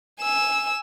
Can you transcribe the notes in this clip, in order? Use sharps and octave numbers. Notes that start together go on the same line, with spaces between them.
G#5 E6